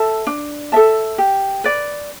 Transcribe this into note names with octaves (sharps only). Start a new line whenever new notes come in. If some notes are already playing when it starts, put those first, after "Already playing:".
Already playing: A4 E5 A5
D4
A4 E5 A5
G4
B4 D5